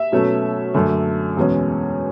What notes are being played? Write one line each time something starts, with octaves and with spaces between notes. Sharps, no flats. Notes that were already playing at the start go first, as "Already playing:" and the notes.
Already playing: E5
B2 F#3 A3 C#4
F#2 D3 A3
E2 B2 G#3 C#4